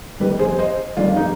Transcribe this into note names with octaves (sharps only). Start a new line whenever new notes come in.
G1 F2 D#3 G3 G4 B4
G#4 C5
C5 D#5
G1 F2 D#3 G3 D4 F4
D#4 G4